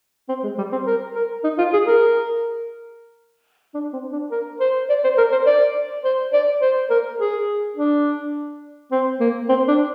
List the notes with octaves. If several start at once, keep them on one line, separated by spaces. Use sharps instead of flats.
C4
G#3
G3
C4
A#4
A#4
D#4
F4
G#4
A#4
D4
C4
D4
A#4
C5
D5
C5
A#4
C5
D5
C5
D5
C5
A#4
G#4
D4
C4
A#3
C4
D4